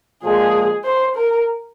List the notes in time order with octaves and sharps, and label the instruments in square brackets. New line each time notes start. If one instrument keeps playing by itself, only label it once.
[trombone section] A#2 F3 G#3 [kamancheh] G#4
[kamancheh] C5
A#4